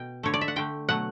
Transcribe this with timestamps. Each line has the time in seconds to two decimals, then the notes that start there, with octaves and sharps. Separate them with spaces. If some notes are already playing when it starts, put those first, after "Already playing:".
Already playing: B2 G5
0.23 D3 A3 C#5
0.34 D5
0.41 E5
0.48 F#5
0.56 D3 A3 G5
0.89 B2 F#3 A3 F#5